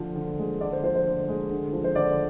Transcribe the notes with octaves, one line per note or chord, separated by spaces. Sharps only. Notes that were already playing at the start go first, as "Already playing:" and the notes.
Already playing: D3 F3 C5
D3
G#3
D3 D5
C5
F3 C5
C5
D3
G#3
D3
F3
C5
D3 D5